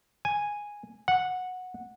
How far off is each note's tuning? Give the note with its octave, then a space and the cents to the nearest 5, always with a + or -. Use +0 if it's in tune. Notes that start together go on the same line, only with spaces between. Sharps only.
G#5 -5
F#5 -10